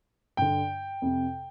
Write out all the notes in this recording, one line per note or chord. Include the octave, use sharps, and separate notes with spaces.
G2 D3 G5
F2 C3